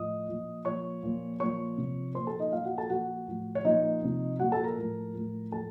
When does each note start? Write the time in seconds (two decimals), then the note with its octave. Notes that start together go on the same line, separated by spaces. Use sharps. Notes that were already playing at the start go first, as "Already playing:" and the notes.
Already playing: A2 F3 D#5 D#6
0.27 A#2 F3
0.65 A#2 F3 C#5 C#6
1.03 A#2 F3
1.40 A#2 F3 C#5 C#6
1.78 C3 F3
2.15 A#2 F3 C5 C6
2.27 A4 A5
2.40 D#4 D#5
2.52 A#2 F3 F4 F5
2.65 F#4 F#5
2.78 A4 A5
2.90 A#2 F3 F#4 F#5
3.27 A2 F3
3.55 C#5
3.65 A#2 F3 D#4 D#5
4.02 C3 F3
4.39 A#2 F3 F#4 F#5
4.52 A4 A5
4.64 A#4 A#5
4.77 A2 F3
5.14 A2 F3
5.52 A2 F3 A4 A5